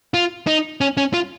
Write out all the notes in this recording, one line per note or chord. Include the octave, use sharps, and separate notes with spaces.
F4
D#4
C#4
C#4
F4